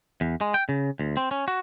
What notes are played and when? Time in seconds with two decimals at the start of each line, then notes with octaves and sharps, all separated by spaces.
0.21 E2
0.41 G#3
0.54 G5
0.69 C#3
0.99 D2
1.17 C4
1.31 C#4
1.48 F#4